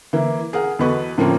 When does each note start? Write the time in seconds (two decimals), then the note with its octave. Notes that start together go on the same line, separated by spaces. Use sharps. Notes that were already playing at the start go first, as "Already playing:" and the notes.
0.13 E3 A#3 E4
0.53 G#4 A#4 F#5
0.79 E2 F#4 A4 B4 D#5 C#6
1.18 A2 F3 A#3 C4 C#4